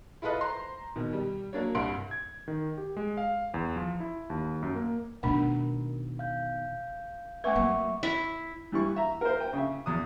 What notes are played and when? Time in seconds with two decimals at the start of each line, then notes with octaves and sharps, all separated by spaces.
0.22 E4 F4 A4 B4 D#5
0.41 C5 A#5 C6
0.96 B2 D#3
1.13 G3
1.53 F#3 A#3 D4 C#5
1.75 C2 G2 C6 D7
2.11 G#6
2.48 D#3
2.78 G4
2.97 G#3
3.17 F5
3.54 E2
3.76 F3
4.00 E4
4.30 D#2
4.62 F#2
4.75 A#3
5.23 B2 D#3 A3 D4 A#4
6.19 F5 G6
7.44 A3 C4 B4 E5 C#6 D6
7.55 F#3 A#3
8.03 E4
8.72 E3 G3 E4 C#6
8.96 E5 A#5
9.21 A#4 C5
9.40 G5
9.53 C#3 E5
9.86 E2 D#6